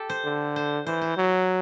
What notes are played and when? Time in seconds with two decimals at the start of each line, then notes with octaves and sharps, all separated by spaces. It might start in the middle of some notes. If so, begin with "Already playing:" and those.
Already playing: G4 A4
0.09 C5
0.25 D3
0.56 C5
0.86 E3 C5
1.01 C5
1.17 F#3